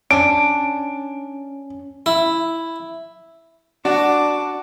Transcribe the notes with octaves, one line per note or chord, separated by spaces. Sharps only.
C#4 D4 D7
E4
D4 F#4 A5 D6